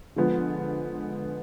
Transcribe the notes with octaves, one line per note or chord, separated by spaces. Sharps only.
D3 F3 G#3 B3